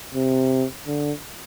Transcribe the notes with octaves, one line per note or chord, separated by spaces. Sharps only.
C3
D3